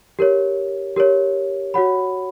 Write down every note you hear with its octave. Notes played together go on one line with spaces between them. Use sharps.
G4 A#4 C#5
G4 A#4 C#5
F#4 C#5 F#5 B5